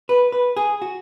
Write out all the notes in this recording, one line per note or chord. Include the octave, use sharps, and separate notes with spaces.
B4
B4
G#4
F#4